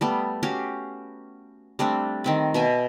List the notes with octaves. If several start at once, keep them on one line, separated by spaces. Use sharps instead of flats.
G3 A3 B3
C#4 F#4 G4 F5
G3 A3 C4 D4
D#3 C4 B5
B2 E5 G#5